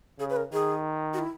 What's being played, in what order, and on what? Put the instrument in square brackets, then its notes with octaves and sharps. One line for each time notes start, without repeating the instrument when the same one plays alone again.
[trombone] C#3 [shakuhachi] G#4
[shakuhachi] B4
A#4
[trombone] D#3 [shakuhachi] G#4
[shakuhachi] F#4
E4